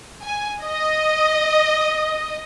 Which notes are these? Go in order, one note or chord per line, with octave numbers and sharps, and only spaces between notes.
G#5
D#5